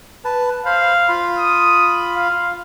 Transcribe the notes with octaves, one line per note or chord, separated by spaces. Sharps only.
B4 A5
C5 F5 B5
F4 B5
D#6
F5